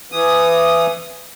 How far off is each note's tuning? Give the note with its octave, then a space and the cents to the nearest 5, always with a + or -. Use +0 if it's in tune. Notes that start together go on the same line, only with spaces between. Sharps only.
E3 +25 D#6 -5